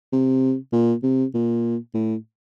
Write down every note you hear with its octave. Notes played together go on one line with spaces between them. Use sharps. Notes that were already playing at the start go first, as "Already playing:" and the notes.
C3
A#2
C3
A#2
A2